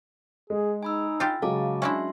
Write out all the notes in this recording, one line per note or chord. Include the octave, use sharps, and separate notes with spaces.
G#3 G#4
D#4 G#5 B5 E6
F4 G4 A6
C#3 F#3 G#3 F5 A5 D6
C#4 D4 E4 E5 C6